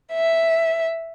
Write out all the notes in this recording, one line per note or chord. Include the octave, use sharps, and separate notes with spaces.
E5